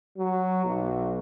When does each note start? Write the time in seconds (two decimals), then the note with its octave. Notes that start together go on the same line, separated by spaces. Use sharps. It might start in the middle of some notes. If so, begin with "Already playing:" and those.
0.17 F#3
0.65 B1